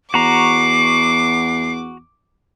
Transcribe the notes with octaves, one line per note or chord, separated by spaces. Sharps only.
E2 F#4 A#5 C#6 D6 C7